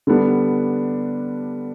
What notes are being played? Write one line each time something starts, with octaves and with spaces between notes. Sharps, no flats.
D3 G3 B3 D4